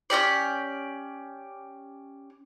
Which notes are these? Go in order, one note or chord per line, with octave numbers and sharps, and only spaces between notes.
C#4 F#4 G4 D5